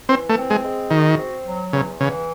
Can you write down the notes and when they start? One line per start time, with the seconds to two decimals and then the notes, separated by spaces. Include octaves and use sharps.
0.09 E3 C4
0.29 A3
0.36 C4
0.50 G#3
0.64 G#3
0.91 D#3 F#4
1.18 C4
1.46 F#3
1.73 E2 C#3
2.00 C#3 E3